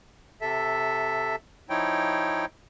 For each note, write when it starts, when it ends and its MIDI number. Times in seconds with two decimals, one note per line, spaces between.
0.41 1.36 48
0.41 1.36 69
0.41 1.36 76
1.70 2.45 53
1.70 2.45 63
1.70 2.45 64
1.70 2.45 73
1.70 2.45 79